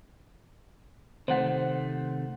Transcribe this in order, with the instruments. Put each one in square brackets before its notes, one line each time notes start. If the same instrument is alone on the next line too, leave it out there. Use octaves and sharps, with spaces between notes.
[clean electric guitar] C3 D#3 A3 [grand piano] C5 F#5